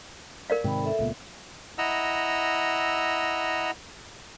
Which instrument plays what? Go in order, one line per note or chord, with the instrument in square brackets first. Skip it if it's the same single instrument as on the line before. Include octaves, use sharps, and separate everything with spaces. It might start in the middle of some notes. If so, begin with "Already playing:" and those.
[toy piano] A#4 D5 F5
[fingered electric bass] G#2 C3 D#3 [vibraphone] G5 B5
[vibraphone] A4 E5
[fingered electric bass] C#2 A#2 [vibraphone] B3
[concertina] E4 D#5 F#5 A#5 E6